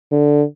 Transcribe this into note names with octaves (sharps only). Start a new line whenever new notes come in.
D3